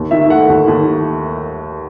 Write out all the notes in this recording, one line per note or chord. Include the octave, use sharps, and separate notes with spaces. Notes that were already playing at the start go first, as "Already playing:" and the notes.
Already playing: D#2
D#3 E5
A3 F#5
D#2
D#2